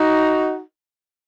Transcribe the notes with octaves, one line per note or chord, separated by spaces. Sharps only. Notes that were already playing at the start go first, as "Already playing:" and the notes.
Already playing: D#4 F#4